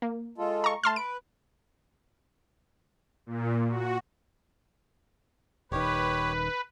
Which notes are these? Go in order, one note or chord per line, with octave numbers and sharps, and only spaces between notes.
A#3
G#3 F4 A4
A#5 C#6
A3 A5 C6 F6
B4 D7
A#2
F#4
D#1 D#3 G4 B4 C#5